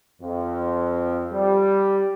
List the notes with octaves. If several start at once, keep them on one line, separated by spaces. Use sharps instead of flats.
F2
G3